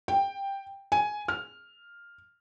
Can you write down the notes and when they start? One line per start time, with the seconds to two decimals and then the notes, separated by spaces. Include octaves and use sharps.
0.08 G5
0.92 G#5
1.28 F6